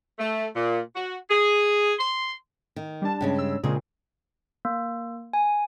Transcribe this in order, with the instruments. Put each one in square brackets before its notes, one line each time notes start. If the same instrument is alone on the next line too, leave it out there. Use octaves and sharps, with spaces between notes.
[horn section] A3
A#2
F#4
G#4
C6
[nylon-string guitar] D#3
[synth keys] G3 D4 A5
[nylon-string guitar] G2 C#3 G#3
[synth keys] E6
[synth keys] A#2 C#3 C4 [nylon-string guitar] G#3 G#4
[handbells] A#3
G#5